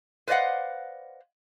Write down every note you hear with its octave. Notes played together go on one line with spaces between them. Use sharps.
B4 C5 D5 D#5 F5 F#5